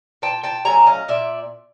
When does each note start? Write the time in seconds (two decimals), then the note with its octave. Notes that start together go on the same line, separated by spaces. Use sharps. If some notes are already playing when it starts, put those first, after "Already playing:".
0.22 A#2 G5 A5
0.44 G5 A5
0.65 F#3 A3 C#4 G#5 A#5
0.86 D#5 F5
1.08 A#2 D5 E5